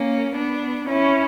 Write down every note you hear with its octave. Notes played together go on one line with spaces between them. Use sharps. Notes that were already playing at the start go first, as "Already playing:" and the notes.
Already playing: A#3 C#4
B3 D4
C#4 E4